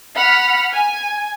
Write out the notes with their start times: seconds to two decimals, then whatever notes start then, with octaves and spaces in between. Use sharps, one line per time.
0.16 F#5 B5 F6
0.73 G#5